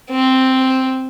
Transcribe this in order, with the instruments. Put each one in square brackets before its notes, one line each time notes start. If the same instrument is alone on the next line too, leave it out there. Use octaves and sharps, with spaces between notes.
[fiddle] C4